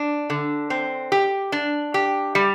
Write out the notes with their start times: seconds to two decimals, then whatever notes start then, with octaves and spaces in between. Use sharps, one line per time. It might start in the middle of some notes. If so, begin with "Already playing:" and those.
Already playing: D4
0.30 D3
0.70 C4
1.12 G4
1.52 D4
1.94 G4
2.35 G3